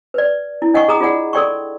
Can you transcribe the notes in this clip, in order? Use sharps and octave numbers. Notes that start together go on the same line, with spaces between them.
B4 D5
E4
D4 D#5 F#5 G5 C#6
G#4 A#5 D#6
F4 G#4 D5 F#5
A4 A#4 D5 G5 C6 C#6